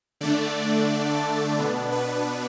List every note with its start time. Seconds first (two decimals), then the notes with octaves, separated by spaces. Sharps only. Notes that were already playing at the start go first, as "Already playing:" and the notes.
0.21 D3 A3 D4 D5
1.58 B2 B3 D4
1.92 B4